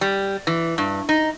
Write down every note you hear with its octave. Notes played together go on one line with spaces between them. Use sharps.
G3
E3
G2
D#4